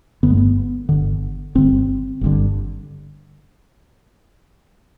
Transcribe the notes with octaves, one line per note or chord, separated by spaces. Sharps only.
G1 G2 D3 B3
G#3
B3
G1 G2 D3
G1 G2 D3 C4
G1 G2 D3